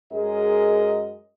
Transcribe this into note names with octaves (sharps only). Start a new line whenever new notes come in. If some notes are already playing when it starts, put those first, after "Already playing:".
F#2 G#3 G#4 A#4 D#5